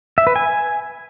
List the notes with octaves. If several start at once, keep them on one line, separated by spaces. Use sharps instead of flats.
E5
B4
G#5